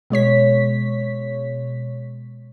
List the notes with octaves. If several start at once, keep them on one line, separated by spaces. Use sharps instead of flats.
B2 G#3 C#5 B6